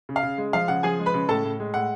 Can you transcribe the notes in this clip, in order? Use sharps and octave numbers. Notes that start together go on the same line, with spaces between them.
C#3
F5
C#3
G#3
F3 F5
C#3 F#5
F3 G#4 G#5
G#3
B4 B5
C#3
A2 A4 A5
A2
G#3
A2 F#5